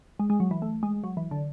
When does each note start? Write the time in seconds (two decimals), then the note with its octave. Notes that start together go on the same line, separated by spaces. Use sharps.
0.19 G#3
0.30 G#3
0.40 F#3
0.51 E3
0.62 A3
0.83 G#3
1.04 F#3
1.17 E3
1.31 D3